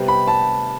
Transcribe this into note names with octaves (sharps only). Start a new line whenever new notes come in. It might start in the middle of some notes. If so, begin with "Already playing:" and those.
Already playing: C3 G3 B3
B5
A5